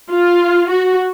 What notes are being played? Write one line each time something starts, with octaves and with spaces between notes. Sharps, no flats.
F4
F#4